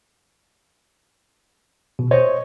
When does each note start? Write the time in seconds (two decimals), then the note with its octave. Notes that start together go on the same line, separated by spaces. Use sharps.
1.99 B2
2.11 C5 C#5 D#5